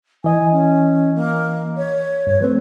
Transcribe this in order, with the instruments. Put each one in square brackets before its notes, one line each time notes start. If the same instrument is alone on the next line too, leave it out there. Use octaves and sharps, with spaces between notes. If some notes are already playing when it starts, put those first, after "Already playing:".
[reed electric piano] E3 D#5 [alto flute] G#5
[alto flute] C#4
A#3
C#5
[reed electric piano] G2 [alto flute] C#5
[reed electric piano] F3 A3 C4 [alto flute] B4